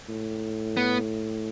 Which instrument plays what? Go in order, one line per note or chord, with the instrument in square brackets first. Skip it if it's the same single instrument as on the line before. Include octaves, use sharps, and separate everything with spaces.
[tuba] A2
[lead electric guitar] B3